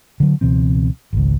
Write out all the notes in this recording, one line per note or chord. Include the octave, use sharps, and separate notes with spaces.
D3 F#3
C#2 B2 E3 C4
G#1 C#2